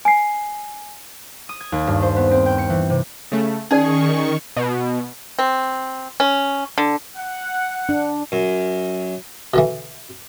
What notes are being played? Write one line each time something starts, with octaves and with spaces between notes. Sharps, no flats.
G#5 C7
D#6
G#6
D#2
G2
C5
B3
C4
G5
C#7
E3
C3
C#3 A3
D#3 C#4 D#4 G#4 D5 C#6
B2
C4
C#4
D3
F#5
D4
F#2
B2 D3 E3